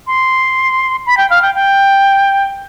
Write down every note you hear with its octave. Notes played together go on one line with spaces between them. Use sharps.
C6
B5
G5
F5
G5
G5